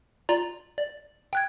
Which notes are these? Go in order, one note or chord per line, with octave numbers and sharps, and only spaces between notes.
F4 D5 A#5
D5
G5 F#6 G#6